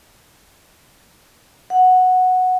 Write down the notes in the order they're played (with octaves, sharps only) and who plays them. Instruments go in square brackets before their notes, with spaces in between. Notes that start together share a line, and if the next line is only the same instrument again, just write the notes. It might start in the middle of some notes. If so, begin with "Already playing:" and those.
[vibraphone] F#5